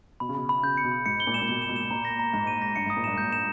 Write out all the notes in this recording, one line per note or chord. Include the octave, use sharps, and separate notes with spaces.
B2 B5
C#3
B2 B5
B5
C#3 G6
C#7
B2
B5
G#2 C#7
G7
A#2
E7
A#2
B2 G7
E7
B2
E7
A#2 A#5
A#6
A#5
G#2 A#5
D#7
A#6
G2 C#7
G#2 D#6
A#2
G2 E7
G#2 G6
E7